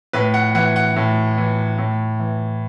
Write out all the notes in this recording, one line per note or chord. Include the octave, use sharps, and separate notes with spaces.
A2 B4
F#5
E3 F#5
F#5
A2
E3
A2
E3